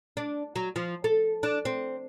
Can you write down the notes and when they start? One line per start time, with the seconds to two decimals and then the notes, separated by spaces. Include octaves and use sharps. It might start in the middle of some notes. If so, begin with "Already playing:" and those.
0.17 D4
0.56 F#3
0.76 F3
1.04 A4
1.43 D4
1.65 C4